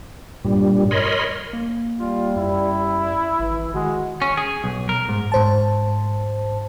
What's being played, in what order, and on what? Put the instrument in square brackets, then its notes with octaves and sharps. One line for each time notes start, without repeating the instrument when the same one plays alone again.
[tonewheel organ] G2 A#2 G3
A#4 C#5 D#5 B5 C6
[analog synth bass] A#3
[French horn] G3 [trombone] F4
[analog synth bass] F#2 [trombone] E4
[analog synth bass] G#1 [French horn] E3
[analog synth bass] D#3 [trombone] G#3 [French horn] F#4
[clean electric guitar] C#4
G#4
B1
A#4
G#2
[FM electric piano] G#2 C5 A5